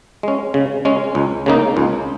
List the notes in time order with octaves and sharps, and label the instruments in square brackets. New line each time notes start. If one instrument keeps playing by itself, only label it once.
[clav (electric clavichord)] G#3 C#4
C#3
G#3 C#4
C#2
C#3 A#3 D#4
C#2